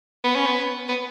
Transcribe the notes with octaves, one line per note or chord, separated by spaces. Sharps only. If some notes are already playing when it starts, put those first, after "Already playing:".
B3
C#4
B3
B3